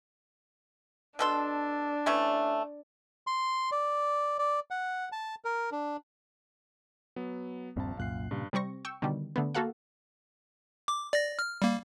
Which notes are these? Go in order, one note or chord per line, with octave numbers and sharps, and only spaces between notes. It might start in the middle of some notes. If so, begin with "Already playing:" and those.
B2 D4 A4 C6
E3 A3 C#4
C6
D5
D5
F#5
A5
A#4
D4
F#3 B3
D#1 A#1 G2 C4 A5
C2 F#2 A#2 F5 F#6 C7
G2 A#2 C#3 G3
C3 G3 C4 C#6 A#6
G5 C#6 E6
B2 D3 D#3 G3
D3 A3 B3
A#3 F#4 A4 F5 F#5
D6
D5 A#6
F6
G3 A#3